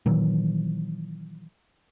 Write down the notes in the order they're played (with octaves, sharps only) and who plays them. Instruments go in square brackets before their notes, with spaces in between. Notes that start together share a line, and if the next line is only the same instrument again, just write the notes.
[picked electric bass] A#2 D#3 E3 F#3